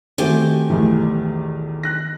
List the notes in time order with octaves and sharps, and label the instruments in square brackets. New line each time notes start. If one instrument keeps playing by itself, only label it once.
[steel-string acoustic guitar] D#3 G4 G#5 [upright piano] A3 C4 F#4
[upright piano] B1 E2 A2
F#6 A#6